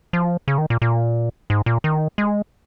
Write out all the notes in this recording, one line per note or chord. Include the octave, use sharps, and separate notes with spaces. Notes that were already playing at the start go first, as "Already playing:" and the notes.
F3
C#3
D#3
A#2
A#2
G#2
A#2
D#3
G#3